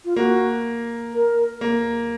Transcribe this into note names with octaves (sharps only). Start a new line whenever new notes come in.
F4
A#3 F#4
A#4
A#3